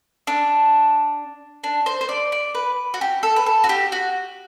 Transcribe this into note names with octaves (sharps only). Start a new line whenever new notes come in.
D4
D4
C5
C5
D5
D5
B4
F#4
G4
A4
B4
A4
F#4
G4
F#4